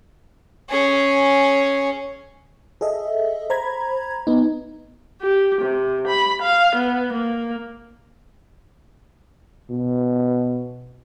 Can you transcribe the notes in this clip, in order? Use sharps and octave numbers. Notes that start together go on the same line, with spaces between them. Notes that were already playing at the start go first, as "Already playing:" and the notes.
C#4 G#4
G#4 A4 D#5 E5
C5 A#5 B5 G#6
B3 D#4
G4
C3
B5
F5
B3
A#3
B2